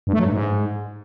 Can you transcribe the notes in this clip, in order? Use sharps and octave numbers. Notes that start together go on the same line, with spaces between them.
G2
A3
F#3
G2
G#2